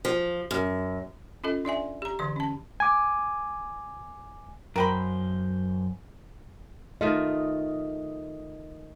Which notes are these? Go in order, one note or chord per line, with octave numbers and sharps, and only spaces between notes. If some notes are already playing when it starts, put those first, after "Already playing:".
F3
F#2
C#4 F4 A4 D#5
D4 D5 E5 G#5
G4 A#5
D3 E3 C6
C#4 A5
G#5 D6
F#2 A#4 C5 G5 B5
D#3 A3 F4 D#5